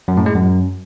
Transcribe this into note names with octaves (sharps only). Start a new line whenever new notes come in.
F#2
A2
G#3
F#2